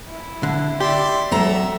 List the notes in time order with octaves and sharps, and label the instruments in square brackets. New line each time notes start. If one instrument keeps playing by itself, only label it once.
[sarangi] E4
[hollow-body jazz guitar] D3
[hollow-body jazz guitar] G4 [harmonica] D5 E5 C6
[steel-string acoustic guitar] F#3 A4 A#5 [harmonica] E5